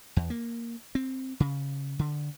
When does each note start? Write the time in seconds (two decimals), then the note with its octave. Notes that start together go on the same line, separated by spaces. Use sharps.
0.17 E2
0.30 A#3
0.95 C4
1.40 C#3
1.99 D3